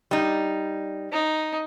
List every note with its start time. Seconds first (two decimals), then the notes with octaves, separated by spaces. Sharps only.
0.11 G3 D#4
1.12 D#4